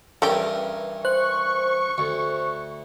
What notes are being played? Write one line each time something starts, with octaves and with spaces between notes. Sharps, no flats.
G2 E3 A3 C#4 G4 A#4
C5 C#6 F#6
D2